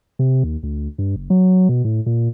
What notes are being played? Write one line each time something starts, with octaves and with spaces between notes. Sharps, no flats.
C3
D#2
D2
G2
F#1
F#3
B2
A2
A#2